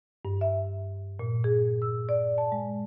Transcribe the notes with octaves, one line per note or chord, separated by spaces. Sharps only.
G2
E5
A#2
G#4
E6
D5
A5
G#3